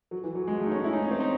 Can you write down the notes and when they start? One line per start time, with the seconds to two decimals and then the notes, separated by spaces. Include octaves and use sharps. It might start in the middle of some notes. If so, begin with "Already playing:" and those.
0.11 F#3
0.24 E3
0.35 F#3
0.48 G#3
0.60 A3
0.66 D#4
0.72 C#4
0.84 E4
0.93 D#4
1.03 C#4
1.11 C4
1.20 D#4